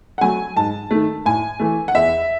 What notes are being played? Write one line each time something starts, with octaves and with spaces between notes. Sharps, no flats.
F#5
F#3 A3 G#5
G#2 A5
D#3 A3
A2 G#5
E3 A3
F#5
E2 E5